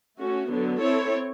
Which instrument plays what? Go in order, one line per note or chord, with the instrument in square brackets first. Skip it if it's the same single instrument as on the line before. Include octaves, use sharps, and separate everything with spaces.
[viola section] A3 C#4 F#4
D3 F#3 B3
C4 E4 A4 C#5